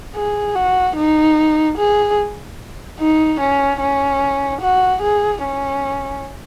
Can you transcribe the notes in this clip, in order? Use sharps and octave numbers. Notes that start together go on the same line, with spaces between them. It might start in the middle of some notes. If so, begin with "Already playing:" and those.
G#4
F#4
D#4
G#4
D#4
C#4
C#4
F#4
G#4
C#4